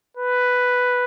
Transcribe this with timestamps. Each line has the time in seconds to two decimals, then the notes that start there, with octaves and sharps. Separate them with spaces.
0.17 B4